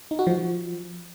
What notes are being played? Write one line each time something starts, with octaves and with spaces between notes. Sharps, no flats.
D#4
F#4
F3